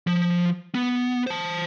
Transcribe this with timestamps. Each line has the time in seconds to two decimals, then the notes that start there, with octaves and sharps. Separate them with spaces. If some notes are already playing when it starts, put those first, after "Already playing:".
0.07 F3
0.75 B3
1.27 C5 A5